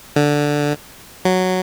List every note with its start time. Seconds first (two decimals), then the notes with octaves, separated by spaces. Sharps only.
0.16 D3
1.25 F#3